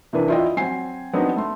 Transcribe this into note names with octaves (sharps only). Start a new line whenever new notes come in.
C3 E3 A#3 D4 B4
E4 F4 D5 D#5 G5
F#3 C4 G#5 C7
F#3 B3 C4 D4 D#4
A3 C6